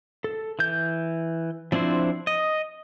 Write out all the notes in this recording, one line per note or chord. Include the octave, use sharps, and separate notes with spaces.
A4
E3 G6
F3 C4 D4 E4 C5
D#5